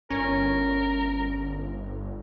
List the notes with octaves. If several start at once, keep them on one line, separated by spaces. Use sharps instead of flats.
G1 C#4 A#4